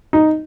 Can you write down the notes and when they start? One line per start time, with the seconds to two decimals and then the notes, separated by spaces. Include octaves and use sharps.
0.13 D#4